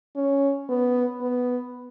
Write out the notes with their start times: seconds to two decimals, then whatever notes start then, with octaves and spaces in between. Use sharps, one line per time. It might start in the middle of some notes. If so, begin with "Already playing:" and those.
0.16 C#4
0.69 B3
1.21 B3